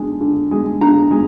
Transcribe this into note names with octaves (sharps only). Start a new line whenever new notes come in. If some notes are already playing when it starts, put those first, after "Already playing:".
Already playing: D3 G#3
D3
G#3
D3 A#5
G#3